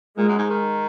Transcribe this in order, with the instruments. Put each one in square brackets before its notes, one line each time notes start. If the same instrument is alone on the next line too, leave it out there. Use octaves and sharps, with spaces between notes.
[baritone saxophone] A#2 [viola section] G#3
[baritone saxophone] F#2
G#2
D#3